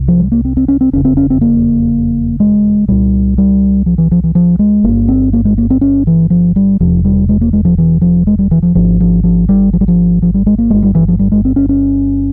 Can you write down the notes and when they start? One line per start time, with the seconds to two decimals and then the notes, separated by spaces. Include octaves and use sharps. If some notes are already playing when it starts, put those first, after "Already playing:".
Already playing: C2 C3
0.08 F3
0.20 G3
0.32 A#3
0.45 C4
0.57 C4
0.68 C#4
0.81 C4
0.93 F1 E2 C#3 C#4
1.05 C4
1.17 C#4
1.30 C4
1.41 A#3
2.40 G#3
2.88 C2 A#2 G3
3.38 G3
3.86 F3
3.98 E3
4.11 F3
4.24 E3
4.35 F3
4.59 G#3
4.84 G1 G2 A#3
5.08 C4
5.33 A#3
5.45 G#3
5.58 A#3
5.70 C4
5.81 C#4
6.07 E3
6.30 F3
6.56 G3
6.80 E1 E2 C3 F3
7.05 G3
7.29 G#3
7.41 A#3
7.53 G#3
7.65 F3
7.78 E3
8.01 F3
8.27 G#3
8.39 G3
8.51 E3
8.63 F3
8.75 G#1 G#2 F3
9.00 F3
9.24 F3
9.49 G3
9.73 F3
9.81 G3
9.88 F3
10.22 F3
10.34 G3
10.46 G#3
10.58 A#3
10.70 G1 G2 G#3
10.83 G3
10.95 E3
11.08 F3
11.19 G3
11.32 G#3
11.45 C4
11.56 C#4
11.69 C#4